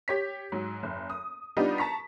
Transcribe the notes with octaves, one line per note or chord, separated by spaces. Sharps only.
G4 C#5 B6
G#2 F#3
F#1
D#6
G3 B3 D4 D#4 F4 G4
A5 A#5 C#6 B6